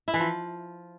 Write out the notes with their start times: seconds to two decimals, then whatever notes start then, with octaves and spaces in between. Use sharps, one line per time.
0.08 E4
0.14 E3
0.20 F3